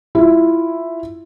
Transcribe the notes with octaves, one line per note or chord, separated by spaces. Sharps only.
E4 F4